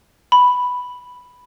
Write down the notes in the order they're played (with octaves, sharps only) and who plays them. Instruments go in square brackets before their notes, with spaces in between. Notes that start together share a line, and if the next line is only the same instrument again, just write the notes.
[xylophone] B5